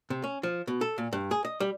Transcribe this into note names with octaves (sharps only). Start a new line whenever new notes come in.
C3
C#4
F3
B2
A4
A#2
G2
G#4
D#5
G3